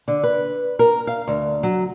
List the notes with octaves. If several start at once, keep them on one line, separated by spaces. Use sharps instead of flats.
D3
B4
A#4
F5
D2
F#3